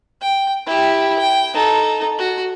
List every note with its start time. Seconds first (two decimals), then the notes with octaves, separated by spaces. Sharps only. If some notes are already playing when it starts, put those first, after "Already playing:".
0.21 G5
0.66 E4 G4
1.18 G5
1.54 D#4 A4
2.18 F#4